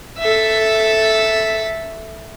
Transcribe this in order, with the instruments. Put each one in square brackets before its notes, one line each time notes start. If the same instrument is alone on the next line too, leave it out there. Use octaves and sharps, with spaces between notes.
[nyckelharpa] A4 E5